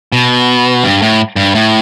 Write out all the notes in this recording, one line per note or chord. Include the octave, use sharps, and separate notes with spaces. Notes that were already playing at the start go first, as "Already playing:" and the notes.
B2
G2
A2
G2
A2